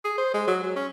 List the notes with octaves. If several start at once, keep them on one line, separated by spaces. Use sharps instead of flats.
G#4
C5
G#3
F#3
F#3
C#4